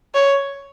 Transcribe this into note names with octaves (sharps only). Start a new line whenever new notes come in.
C#5